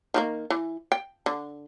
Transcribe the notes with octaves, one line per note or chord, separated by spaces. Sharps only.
D#3 F3 A#3
E3
G5
D3